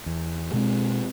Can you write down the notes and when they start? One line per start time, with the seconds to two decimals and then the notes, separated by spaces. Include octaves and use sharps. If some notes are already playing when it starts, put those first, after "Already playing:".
0.06 E2
0.53 B2 G#3 C4